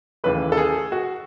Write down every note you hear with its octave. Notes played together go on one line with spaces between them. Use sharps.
D#2 C#3 E3 A3 B4
A4
G#4
F#4